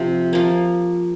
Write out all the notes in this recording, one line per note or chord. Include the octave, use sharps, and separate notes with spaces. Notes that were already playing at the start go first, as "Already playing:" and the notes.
Already playing: C3 F3 C4
F3 A#3